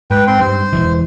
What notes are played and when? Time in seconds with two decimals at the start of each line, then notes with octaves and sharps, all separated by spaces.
0.11 G#2 B4 G5
0.27 C4 G5 C6
0.40 G2 C5
0.73 E1 C#2 E3